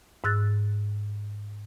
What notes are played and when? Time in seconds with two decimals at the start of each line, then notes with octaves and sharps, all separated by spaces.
0.24 G#2 E6 F#6 A6